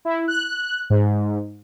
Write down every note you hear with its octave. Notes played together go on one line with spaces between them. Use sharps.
E4
F#6
G#2